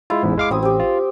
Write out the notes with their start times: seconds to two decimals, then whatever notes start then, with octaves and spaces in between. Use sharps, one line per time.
0.10 G#3 E4 F4
0.23 A1 E2 G#2
0.38 G#3 F5 D6
0.51 A1 F#3 C4 D#6
0.63 C4 G4
0.80 F4